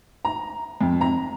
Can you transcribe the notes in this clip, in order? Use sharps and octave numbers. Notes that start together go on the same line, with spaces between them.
A#5
F2
A#5